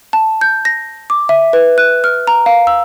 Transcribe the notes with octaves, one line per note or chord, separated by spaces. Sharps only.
A5
G6
A#6
D6
E5
B4
F#6
F6
A#5
F5
E6